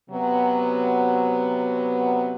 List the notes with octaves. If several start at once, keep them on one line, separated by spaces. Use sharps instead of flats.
C3 F#3 B3